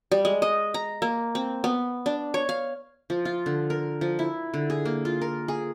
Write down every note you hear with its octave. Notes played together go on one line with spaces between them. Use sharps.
G3
G#3
D#5
A#5
A#3
C4
B3
D4
C#5
F5
F3
F4
D3
A#4
F3
E4
D3
G#4
A#3
F4
A#4
G#4